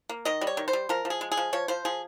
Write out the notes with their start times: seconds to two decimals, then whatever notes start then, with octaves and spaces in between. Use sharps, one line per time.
0.09 A#3
0.25 D#3 D#5
0.41 G3
0.47 C#5
0.57 D#3
0.68 C5
0.73 G3
0.89 F3 A#4
1.05 F3
1.10 G#4
1.21 G#3
1.32 G#4
1.37 F3
1.53 F3 C#5
1.68 F3 C5
1.85 F3 G#4